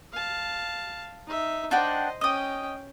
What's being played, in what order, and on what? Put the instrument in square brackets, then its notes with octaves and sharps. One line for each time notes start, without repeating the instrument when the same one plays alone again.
[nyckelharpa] F5 A5
D#4 E5
[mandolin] D4 F#5 G5 [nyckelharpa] C5 D#5
[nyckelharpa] C#4 G5 [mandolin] D#5 D#6